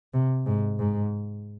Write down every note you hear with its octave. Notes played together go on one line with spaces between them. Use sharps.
C3
G#2
G#2